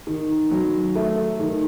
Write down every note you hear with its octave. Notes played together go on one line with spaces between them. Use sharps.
D#3
F#3
A3
D#3